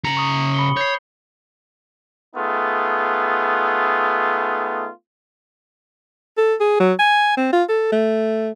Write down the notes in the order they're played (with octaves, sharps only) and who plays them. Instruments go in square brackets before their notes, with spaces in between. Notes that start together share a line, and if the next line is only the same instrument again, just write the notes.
[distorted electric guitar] C#3 A#5 [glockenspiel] C#7 F#7
[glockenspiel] C#6 D#6
B5 C#7 G7
[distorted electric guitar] C#5 [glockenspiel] G6 C7
[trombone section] A3 B3 D#4 F4 G#4
[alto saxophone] A4
G#4
F#3
G#5
C4
F4
A4
A3